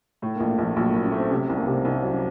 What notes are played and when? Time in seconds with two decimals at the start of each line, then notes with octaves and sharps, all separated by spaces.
0.22 A2 A3
0.36 A#1 A#3
0.49 A#3
0.58 A#1 F3
0.76 A#1 F#3
0.90 A2 A#3
1.04 C#4
1.12 A3 C4
1.30 C3 C#4
1.44 C4
1.49 C2
1.58 A#3
1.67 C3 C4
1.85 C2 D#4
2.02 F#3
2.11 C#4